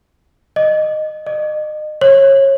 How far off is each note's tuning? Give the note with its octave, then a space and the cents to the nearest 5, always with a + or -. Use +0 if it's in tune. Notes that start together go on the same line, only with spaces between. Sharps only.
D#5 -15
D#5 -35
C#5 -25